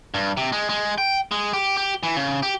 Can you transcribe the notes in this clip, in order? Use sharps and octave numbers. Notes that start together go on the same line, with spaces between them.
G2
C3
G#3
G#3
G5
G#3
G4
G4
E3
C#3
G4